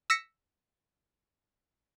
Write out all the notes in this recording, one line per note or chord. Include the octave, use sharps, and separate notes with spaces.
E6 A#6 B6 C#7